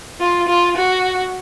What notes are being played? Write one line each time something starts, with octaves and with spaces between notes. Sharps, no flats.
F4
F4
F#4